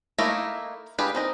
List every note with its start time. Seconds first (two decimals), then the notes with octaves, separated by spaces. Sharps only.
0.18 A3 A#3 D#4 E4 A#4
0.98 D4 G4 G#4 B4 F5
1.15 C4 D#4 A#4